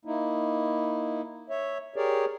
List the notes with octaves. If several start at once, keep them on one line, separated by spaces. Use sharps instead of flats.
A#3 D#4 E4
C#5 E5
G4 G#4 A#4 C#5 D5